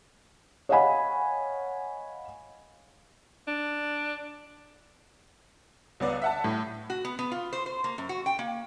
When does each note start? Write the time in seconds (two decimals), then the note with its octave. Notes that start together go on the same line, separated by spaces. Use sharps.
0.69 C#5 D#5 F5 F#5 G#5 B5
3.47 D4
6.00 C#2 B3 D5
6.22 E5 F#5 A5
6.44 A2
6.90 F#4
7.05 B3
7.19 B3
7.32 F4
7.53 C5
7.66 C5
7.84 A#3
7.98 F#2
8.09 F#4
8.26 G5
8.39 A#3